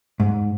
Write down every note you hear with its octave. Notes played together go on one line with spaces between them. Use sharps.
G#2